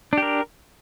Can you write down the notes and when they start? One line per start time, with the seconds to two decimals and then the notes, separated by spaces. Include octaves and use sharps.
0.13 D4
0.18 G4
0.22 A#4